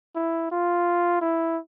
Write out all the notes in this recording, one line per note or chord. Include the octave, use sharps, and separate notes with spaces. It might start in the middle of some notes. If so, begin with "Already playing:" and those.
E4
F4
E4